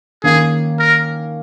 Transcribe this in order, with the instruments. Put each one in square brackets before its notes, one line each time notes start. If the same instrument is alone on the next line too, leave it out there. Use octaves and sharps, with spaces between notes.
[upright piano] D#3 A#3 C#4 [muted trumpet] G#4
[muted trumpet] A#4